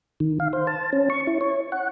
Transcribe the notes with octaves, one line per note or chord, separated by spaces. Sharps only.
D#3
F5
C5
A5
C#4
C#6
E4
C#5
F#5